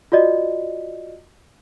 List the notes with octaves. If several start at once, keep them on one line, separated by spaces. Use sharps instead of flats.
F4 F#4 D5 D#5